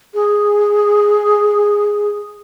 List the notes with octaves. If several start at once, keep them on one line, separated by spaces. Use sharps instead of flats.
G#4